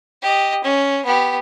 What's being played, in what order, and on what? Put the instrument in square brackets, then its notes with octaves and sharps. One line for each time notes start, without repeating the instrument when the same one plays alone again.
[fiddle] G4 D#5
C#4
B3 G4